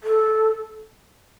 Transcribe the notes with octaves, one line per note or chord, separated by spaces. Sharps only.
A4